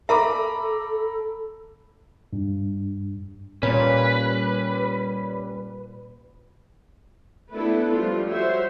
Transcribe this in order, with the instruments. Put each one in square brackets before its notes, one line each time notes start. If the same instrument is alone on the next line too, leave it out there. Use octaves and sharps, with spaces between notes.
[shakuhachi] A4 [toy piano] A#4 E5 [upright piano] A#5 B5 D6
[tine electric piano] G2
[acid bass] A#2 [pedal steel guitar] G3 C#4 [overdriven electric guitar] B4 [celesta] C#5
[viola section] A3 B3 D4 E4 A4 B4
F3 G3 A3 F4
F#4 C5 C#5 E5